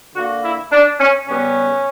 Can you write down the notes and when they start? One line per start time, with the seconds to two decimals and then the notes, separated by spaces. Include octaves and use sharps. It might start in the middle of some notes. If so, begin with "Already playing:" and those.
0.15 D3 A#3 F#4
0.44 E4
0.72 D4
1.00 C#4
1.28 C#3 G3 B3 C#4